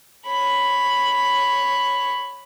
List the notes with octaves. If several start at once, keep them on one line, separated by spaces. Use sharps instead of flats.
C#5 B5